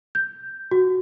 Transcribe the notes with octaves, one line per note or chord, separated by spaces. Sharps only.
G6
F#4